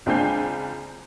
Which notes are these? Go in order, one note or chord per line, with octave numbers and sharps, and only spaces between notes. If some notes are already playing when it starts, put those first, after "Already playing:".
C#2 C4 D4 G#5 G6 C7